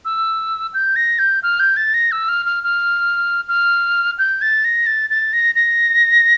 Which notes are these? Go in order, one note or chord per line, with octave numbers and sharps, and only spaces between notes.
E6
G6
A#6
G6
F6
G6
A6
A#6
E6
F6
F6
F6
F6
G6
A6
A#6
A6
A6
A#6
A#6